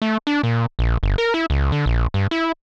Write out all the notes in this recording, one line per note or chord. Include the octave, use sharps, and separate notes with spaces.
A3
D4
A#2
A#1
G1
A#4
E4
C#2
D3
A#1
G2
E4